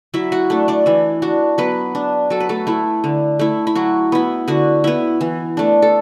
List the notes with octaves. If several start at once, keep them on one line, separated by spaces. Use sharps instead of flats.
F#3 E4 E5
F#4 F#5
A3 D4
D4 D5
E3 E4
D4 F#4
F#3 B3 B4
D4
F#3 A4
B4
A3 A4
A3 E4
D3
A3 E4
E4
F#3 F#4
B3 E4
D3 F#4
B3 E4
E3
A3 D4
A4